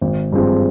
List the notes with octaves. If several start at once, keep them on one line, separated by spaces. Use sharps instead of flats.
G#1
G2 F3 G#3 C4